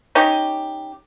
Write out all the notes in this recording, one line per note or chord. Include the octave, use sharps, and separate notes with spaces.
C#4 D#4 G4